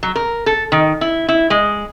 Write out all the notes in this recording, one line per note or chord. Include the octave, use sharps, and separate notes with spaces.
F#3
A#4
A4
D#3
E4
E4
G#3